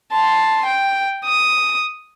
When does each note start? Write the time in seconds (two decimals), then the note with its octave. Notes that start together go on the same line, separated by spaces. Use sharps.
0.13 A5 C6
0.66 G5
1.25 D#6